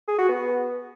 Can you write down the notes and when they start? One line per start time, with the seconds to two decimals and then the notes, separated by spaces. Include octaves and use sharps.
0.08 G#4
0.18 F#4
0.29 B3